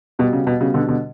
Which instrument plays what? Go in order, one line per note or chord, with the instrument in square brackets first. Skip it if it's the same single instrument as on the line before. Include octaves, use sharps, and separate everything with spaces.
[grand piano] B2 [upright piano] G3 B3 F#4
[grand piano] C#3
B2
[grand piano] C#3 [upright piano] G3 B3 F#4
[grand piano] B2 D3
B2 D3